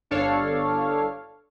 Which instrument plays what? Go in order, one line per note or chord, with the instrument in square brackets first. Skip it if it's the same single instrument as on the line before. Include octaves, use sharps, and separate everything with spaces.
[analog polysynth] G1 D4 A4 C#5 F5